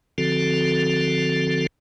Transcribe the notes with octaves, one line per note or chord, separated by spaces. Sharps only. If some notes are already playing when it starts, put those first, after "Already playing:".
D3 F3 C4 F#4 A4